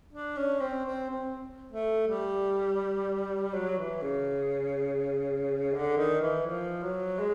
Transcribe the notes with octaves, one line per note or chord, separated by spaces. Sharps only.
D4
C#4
C4
C4
C4
A3
G3
F#3
E3
C#3
D3
D#3
E3
F3
F#3
G#3